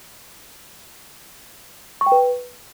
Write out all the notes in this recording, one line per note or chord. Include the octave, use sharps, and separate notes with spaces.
C#6
G5
B4